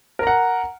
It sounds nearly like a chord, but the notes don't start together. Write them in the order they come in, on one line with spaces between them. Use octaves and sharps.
A#4 A#5 F#5